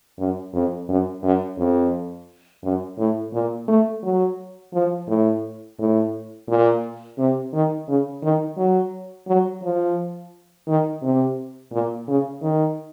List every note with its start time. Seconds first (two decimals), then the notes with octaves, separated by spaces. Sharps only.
0.19 F#2
0.54 F2
0.89 F#2
1.23 F#2
1.58 F2
2.64 F#2
2.98 A2
3.33 A#2
3.68 A3
4.03 F#3
4.74 F3
5.08 A2
5.79 A2
6.48 A#2
7.18 C3
7.53 D#3
7.88 C#3
8.23 D#3
8.57 F#3
9.28 F#3
9.63 F3
10.68 D#3
11.03 C3
11.72 A#2
12.08 C#3
12.42 D#3